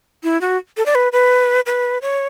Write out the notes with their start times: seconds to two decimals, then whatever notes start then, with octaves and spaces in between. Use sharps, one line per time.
0.23 E4
0.41 F#4
0.77 A4
0.86 D5
0.95 B4
1.13 B4
1.66 B4
2.02 C#5